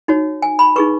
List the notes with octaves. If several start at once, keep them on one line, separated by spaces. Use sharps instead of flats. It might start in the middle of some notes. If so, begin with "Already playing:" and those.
D#4 F#4 C#5
G#5
B5
D#4 G#4 B4 C#6